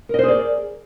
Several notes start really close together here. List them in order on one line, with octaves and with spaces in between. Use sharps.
A#4 D#5 C5 G#4 D5